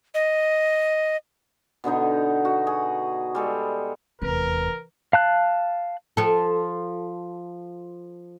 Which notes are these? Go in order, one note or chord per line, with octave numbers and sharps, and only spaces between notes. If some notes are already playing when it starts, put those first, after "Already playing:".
D#5
B2 D3 B3 D#4
F#4
G#4
G3 G#3 A4
F1 E2 A#4 B4
F5 A5 F#6
F3 A4